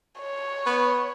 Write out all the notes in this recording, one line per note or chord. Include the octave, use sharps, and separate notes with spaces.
C#5
B3